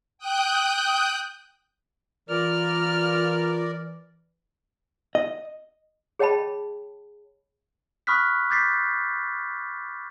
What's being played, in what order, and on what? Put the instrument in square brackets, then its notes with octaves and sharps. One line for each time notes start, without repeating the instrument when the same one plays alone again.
[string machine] G5 D#6 F#6 G6
[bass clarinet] E3 [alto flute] F4 [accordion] A#4 D5 [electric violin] F6
[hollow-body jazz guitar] D#5
[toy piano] G#4 C#5 D#5 G5 A5 B5
[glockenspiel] B5 C#6 D#6 F6 F#6 B6
D6 G6 A6 B6 C7